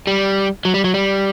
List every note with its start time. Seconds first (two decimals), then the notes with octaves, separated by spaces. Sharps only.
0.07 G3
0.65 F#3
0.74 G3
0.84 F#3
0.94 G3